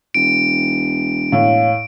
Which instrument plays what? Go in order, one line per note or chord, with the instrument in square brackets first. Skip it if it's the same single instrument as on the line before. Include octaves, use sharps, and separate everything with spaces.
[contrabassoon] E1 [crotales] D7
[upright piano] A2 [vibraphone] C#5 F5